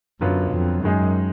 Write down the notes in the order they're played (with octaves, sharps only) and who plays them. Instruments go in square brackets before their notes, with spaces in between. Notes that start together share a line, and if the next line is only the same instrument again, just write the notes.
[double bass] F#2 [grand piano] D3 F#3 B3 F4
[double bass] F2
[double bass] F#2 [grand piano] D#3 G#3 D#4 G#4